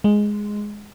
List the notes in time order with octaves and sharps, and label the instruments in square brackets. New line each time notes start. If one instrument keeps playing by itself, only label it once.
[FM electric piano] G#3